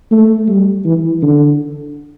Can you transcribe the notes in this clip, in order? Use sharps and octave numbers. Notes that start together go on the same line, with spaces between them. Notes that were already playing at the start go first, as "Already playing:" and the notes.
A3
G3
E3
D3